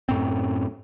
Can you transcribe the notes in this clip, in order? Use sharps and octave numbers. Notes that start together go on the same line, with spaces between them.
F#2 A2 C4